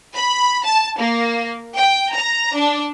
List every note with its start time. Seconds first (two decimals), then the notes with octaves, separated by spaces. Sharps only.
0.16 B5
0.65 A5
0.98 A#3
1.76 G5
2.14 A#5
2.58 D4